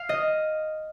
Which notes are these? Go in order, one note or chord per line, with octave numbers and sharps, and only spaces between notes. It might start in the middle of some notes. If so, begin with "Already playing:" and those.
Already playing: F5
D#5